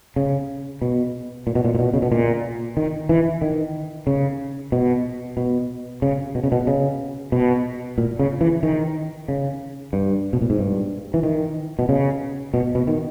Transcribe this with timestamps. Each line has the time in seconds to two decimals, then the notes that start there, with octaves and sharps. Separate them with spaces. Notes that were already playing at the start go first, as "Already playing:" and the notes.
0.16 C#3
0.82 B2
1.47 A#2
1.55 B2
1.65 A#2
1.75 A#2
1.79 B2
1.94 C#3
2.02 B2
2.12 A#2
2.77 D#3
3.09 E3
3.42 D#3
4.07 C#3
4.72 B2
5.37 B2
6.02 C#3
6.35 B2
6.44 C#3
6.52 B2
6.67 C#3
7.32 B2
7.98 A#2
8.19 C#3
8.41 E3
8.63 D#3
9.28 C#3
9.93 G2
10.33 B2
10.41 A#2
10.50 G#2
10.59 G2
11.14 E3
11.23 D#3
11.79 B2
11.89 C#3
12.54 B2
12.75 B2
12.87 D#3